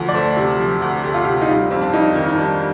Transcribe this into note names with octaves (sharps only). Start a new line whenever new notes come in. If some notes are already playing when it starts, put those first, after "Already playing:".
Already playing: D2 F3
D5
A3 C5
C3
F3
D2
A3 G4
F4
C3 G4
D#4
G3 F4
F2 C4
D4
F2 D#4
D#3
D#4
G3 D4